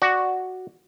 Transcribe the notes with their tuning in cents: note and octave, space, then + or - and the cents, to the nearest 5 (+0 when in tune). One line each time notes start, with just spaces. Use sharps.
F#4 +0 D5 +5